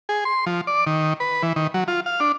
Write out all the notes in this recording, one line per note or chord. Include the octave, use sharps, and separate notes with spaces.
G#4
C6
F3
D5
D#3
B4
E3
D#3
F#3
F4
F5
D4